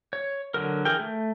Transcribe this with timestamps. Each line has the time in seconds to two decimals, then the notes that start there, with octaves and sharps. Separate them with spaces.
0.13 C#5
0.54 D3 F#3 A#4
0.85 E3 G#4 A#4 G5
1.00 A3